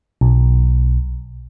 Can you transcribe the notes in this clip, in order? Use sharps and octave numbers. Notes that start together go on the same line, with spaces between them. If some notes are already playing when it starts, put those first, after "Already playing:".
B1